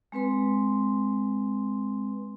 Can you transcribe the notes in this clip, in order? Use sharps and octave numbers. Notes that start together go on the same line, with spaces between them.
G#3 C4 B4 C6